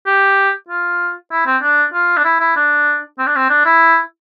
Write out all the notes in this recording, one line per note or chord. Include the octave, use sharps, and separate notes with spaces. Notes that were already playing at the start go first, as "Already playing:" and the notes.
G4
F4
E4
C4
D4
F4
D4
E4
E4
D4
C4
D4
C4
D4
E4